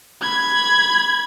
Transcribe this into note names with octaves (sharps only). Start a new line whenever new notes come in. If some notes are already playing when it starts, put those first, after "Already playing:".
B5 G#6